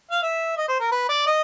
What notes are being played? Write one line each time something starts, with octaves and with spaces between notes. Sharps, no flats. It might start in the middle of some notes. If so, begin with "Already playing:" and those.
F5
E5
D#5
C5
A#4
B4
D5
D#5